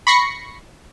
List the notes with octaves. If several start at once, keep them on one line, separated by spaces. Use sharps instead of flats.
B5 C#6 A#6 C7 C#7